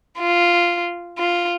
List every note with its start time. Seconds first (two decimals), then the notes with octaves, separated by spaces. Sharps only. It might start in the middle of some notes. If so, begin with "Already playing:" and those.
0.20 F4
1.18 F4